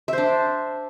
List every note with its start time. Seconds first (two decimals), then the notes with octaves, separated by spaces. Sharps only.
0.08 E5
0.13 C5
0.18 D4